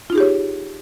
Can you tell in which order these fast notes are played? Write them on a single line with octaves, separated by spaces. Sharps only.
F4 D#4 G#4 G4 C#5